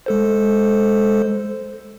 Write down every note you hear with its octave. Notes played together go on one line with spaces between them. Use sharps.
G#3 A4 C5